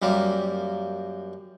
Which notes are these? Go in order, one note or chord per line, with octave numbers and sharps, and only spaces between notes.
F#2 G3 A#3